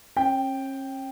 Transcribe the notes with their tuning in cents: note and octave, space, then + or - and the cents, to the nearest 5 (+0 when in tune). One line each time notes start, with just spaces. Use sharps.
C#4 -40 G5 +0